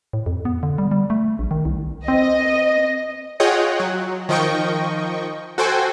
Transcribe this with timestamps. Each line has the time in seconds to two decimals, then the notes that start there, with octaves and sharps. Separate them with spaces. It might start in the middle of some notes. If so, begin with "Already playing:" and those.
0.13 A2
0.26 F2
0.45 B3
0.63 D3
0.78 G3
0.91 G3
1.10 A3
1.39 A#1
1.51 D#3
1.65 C2
2.08 C4 D#5
3.40 F4 G#4 C#5 D#5 F#5 G5
3.80 F#3
4.29 D#3 F3 D#5 G5 C#6
5.58 F#4 A4 C5 G5 G#5